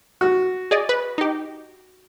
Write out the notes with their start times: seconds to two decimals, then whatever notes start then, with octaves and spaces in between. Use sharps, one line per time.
0.21 F#4
0.71 G#4 D5 D#5
0.89 B4
1.18 D#4 G4